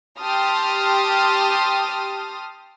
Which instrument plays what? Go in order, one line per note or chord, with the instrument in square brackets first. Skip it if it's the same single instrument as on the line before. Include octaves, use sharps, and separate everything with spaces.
[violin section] G4 A5 C6 D#6 F6